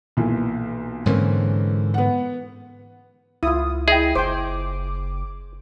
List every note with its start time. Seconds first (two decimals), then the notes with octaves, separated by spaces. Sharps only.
0.17 B1 A#2 E3
1.06 G#2 D3 E3 A#3 C4 C#4
1.94 B3 F#5
3.43 C#2 E4 F4 D#6
3.88 E4 G#4 D#5 G5
4.15 F#1 C5 G5 D6